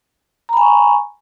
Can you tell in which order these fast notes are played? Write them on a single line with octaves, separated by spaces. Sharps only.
A#5 B5 G#5 C#6